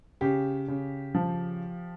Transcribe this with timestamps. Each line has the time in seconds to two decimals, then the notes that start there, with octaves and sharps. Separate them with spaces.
0.21 C#3 G4
0.68 C#3
1.14 F3